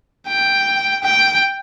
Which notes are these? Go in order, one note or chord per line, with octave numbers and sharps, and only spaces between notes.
G5
G5